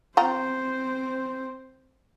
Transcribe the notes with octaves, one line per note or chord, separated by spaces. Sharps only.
C4 F4 C5 G5 A#5